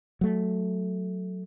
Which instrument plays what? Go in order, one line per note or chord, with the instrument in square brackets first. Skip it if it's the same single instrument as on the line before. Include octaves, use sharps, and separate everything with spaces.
[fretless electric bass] F#3 A3